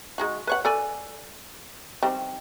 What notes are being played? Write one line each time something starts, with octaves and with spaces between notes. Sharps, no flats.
G#3 D#4 F#4
B4 C#5 F#5
A4 D5 G#5
G3 C4 D#4